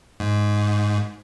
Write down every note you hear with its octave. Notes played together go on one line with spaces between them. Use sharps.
G#2